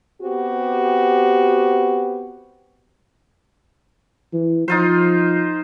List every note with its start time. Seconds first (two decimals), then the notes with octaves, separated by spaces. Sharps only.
0.21 B3 C4 F#4 G4
4.33 E3
4.68 F3 D#4 F4 C5